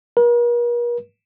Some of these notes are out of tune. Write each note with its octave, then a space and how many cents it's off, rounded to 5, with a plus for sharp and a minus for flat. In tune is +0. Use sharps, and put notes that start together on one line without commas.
A#4 +45